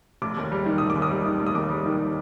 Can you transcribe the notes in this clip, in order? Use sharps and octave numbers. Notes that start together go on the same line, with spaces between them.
F1 D6
D#2
G3
D#3
F1 D#6
D6
D#2
D#6
G3
D#3
F1
D#6
D#2 D6
G3
D#3